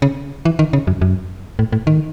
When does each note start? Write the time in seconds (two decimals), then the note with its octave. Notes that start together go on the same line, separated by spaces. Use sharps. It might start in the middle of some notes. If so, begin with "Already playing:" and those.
0.02 C#3
0.45 E3
0.59 D#3
0.73 C#3
0.87 F#2
1.01 F#2
1.59 A2
1.72 A2
1.87 D#3